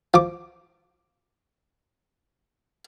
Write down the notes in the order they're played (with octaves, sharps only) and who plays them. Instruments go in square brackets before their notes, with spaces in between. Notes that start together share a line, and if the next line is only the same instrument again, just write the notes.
[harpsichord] F3 D6